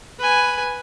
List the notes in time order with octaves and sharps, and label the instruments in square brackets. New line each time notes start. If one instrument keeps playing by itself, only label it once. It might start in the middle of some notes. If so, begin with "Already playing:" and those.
[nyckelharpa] B4 G#5